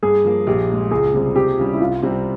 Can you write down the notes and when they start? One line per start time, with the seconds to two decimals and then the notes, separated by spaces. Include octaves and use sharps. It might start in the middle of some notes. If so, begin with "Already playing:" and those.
0.03 G2 G#4
0.25 F3 A#3
0.47 A#1 G4
0.69 A#2 G#3
0.91 C#2 G#4
1.14 C3 G3 C4
1.36 C3 G4
1.58 G3 C#4 F4
1.73 E4
1.80 C2 F4
2.03 C3 G3 C4